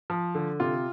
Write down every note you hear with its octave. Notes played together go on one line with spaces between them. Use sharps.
F3
D3
C3 F4